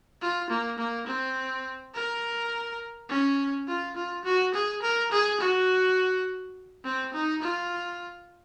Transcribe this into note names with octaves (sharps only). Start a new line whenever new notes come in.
F4
A#3
A#3
C4
A#4
C#4
F4
F4
F#4
G#4
A#4
G#4
F#4
C4
D#4
F4